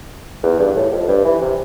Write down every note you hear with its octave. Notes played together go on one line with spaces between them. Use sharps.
E2
G2
A2
F2
G2
E3
C3